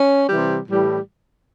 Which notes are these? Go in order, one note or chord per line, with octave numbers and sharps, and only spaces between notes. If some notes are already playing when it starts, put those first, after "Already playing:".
Already playing: C#4
C3 E3 G3
A2 E3 G3